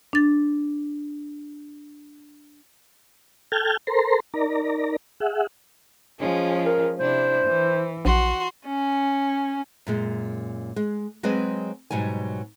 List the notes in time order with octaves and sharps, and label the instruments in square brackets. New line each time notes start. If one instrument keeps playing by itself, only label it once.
[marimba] D4 A6
[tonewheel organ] A4 G5 A5 F6 G6 G#6
A4 A#4 C5 A#5 C6
D#4 A#4 D5 A#5
G#4 E5 F#5
[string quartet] F3 G#3 C#4
[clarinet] A#4
[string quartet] C3 D4 E4 [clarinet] C5
[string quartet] E3
[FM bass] A#1 [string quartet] F#4 C6
[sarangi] C#4
[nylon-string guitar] F#2 A#2 G#3
G#3
F#3 G#3 C4 G#4 B4 D#5
G#2 B2 F#3 G3 G#5